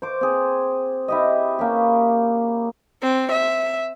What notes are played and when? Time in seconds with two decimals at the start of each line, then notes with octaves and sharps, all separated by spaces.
0.02 C5 D6
0.21 C4 G#4
1.08 E4 G4 D#5
1.59 A#3 C#4 G4
3.02 C4
3.32 E5